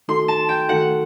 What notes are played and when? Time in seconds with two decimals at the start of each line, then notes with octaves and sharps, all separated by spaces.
0.08 D#3 A3 D#4 F#4 A4 C6
0.28 A5
0.49 G5
0.69 D#3 A3 D#4 F#4 A4 F#5